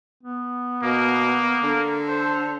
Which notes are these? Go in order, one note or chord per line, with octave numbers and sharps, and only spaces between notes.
B3
B2 A#3
D3 A4
C5